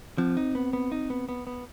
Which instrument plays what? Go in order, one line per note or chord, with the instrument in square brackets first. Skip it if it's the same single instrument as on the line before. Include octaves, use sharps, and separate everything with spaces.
[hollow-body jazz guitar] F3 [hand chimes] C4
[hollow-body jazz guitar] D#4
B3
B3
D#4
B3
B3
B3